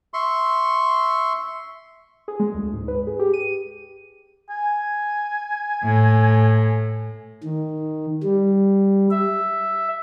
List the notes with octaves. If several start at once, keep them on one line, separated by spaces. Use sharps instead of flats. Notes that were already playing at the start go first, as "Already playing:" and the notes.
E5 C6 C#6
G#4
G#3
D2
G#2
B4
G#4
G4
D#7
G#5
A2
D#3
G3
E5